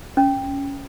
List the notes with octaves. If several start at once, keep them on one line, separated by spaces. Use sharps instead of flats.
C#4